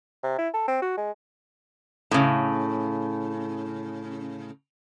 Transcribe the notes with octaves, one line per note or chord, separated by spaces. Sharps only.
C3
E4
A4
C4
F#4
G#3
A2 C#3